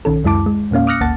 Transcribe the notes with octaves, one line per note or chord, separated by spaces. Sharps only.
B1 D#3 C#4 A4
C#2 F#2 G#3 E4 A5 D6
G#3
E2 A#2 A#3 C#4 F5
D6 D#6 F6 F#6 A#6 C#7
G#1 D2 A#3 F#5 A5 A6